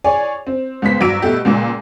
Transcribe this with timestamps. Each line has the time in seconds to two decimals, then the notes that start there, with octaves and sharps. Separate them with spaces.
0.04 G#4 C#5 D5 G#5
0.47 C4
0.82 C#2 B3 C5 B6
1.00 G2 F#3 D6 E6 D7
1.22 B2 A3 G4
1.45 C#2 A#2 D6